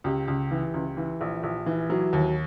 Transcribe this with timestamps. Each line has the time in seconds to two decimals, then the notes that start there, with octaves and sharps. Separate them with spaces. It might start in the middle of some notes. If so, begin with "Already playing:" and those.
0.04 C#2 G4
0.28 C#2
0.51 E3
0.74 C#2
0.97 E3
1.21 A#1
1.43 A#1
1.66 E3
1.90 F#3
2.13 D#2